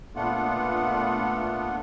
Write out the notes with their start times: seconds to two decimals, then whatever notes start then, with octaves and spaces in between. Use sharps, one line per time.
0.16 A#2 A3 B3 D4 F4 F#5